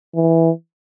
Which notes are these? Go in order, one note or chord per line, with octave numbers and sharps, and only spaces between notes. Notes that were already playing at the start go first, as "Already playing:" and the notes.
E3